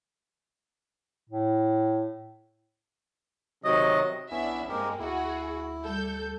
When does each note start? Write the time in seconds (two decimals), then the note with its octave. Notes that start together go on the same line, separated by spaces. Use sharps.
1.29 A2
3.65 C3 D#3 F#3 D#5
4.31 A#1 B3 C#4 D4 E4 E5
4.69 G2 G#3 A#3 C4 G4 A#4
4.99 D2 E4 F#4 G#4
5.82 G3 A4 G6